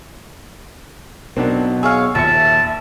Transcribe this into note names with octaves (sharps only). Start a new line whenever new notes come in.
B1 B2 C4 D4 A#4
G#4 C#5 F5 E6
A#1 D#2 E5 A5 C#7